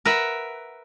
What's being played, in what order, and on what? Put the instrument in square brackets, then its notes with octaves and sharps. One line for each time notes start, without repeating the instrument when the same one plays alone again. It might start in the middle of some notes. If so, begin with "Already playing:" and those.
[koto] A#4 B4 E5 F#5